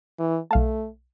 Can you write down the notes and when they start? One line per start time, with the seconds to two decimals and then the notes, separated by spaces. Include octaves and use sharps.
0.19 E3
0.51 B1 A3 F5 A5